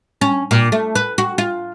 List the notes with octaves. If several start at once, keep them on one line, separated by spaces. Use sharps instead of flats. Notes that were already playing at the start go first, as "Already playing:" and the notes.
C#4
A#2
A3
B4
F#4
F4